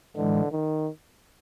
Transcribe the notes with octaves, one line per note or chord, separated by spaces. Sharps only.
A2 D3 E3 G#3
D#3